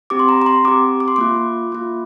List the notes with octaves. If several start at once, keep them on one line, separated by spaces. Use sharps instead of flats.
C4 G4 D6
C6
A#5
A#5
C6
C4 G4 D6
D6
C6
A#3 F4 D6
A#3 F4